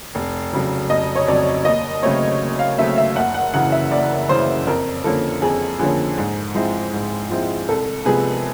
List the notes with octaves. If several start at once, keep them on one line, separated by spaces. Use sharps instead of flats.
F1
F2 C#3 F#3
F1 D#5
C#5
F2 C#3 F#3 D5
D#2 D#5
C#3 F#3 A3 C4 C#5
D#2
F5
C#3 F#3 A3 C4 E5
E5
F#1 F#5
F#5
F#2 C#3 E3 F#5
E5
F#1 D5
F#2 C#3 E3 C5
F2 A#4
D3 F3 A#3 C#4 A4
F2 G#4
D3 F3 A#3 C#4 G#4
G#2
F3 G#3 C4 E4
G#2
F3 G#3 C4 E4
C2 A4
C3 F3 G#3 B3 G#4